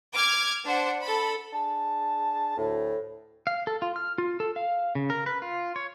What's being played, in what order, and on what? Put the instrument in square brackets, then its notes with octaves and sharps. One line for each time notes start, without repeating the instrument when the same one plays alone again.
[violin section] D6 F6 G#6
D4 C5 F#5
A4 B5
[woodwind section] D4 G#4 A5
D2 A2
[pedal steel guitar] F5
A4
F4
F6
F4
A4
F5
C#3
A#4
B4
F4
C#5